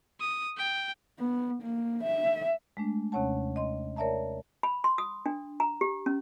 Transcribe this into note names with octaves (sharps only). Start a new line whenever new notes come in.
D#6
G5
B3
A#3
E5
G#3 A3 D4
D#2 C3 C#4 C#5 F#5 A5
D#5 C6
A#4 C#5 D5 E5 A5 A#5
B5
C6
D#6
D4
A#5
G4
C#4